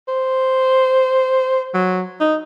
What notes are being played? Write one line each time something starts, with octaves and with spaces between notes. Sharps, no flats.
C5
F#3
D#4